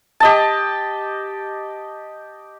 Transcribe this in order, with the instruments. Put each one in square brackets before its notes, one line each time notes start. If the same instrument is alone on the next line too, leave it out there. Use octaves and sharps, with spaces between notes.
[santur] G4 D#5 A5